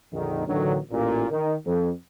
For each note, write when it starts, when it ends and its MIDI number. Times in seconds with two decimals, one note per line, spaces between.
0.13 0.47 34
0.13 0.47 41
0.13 0.47 50
0.13 0.47 51
0.47 0.77 33
0.47 0.77 50
0.47 0.77 51
0.47 0.77 54
0.91 1.25 33
0.91 1.25 46
1.30 1.54 51
1.67 1.91 41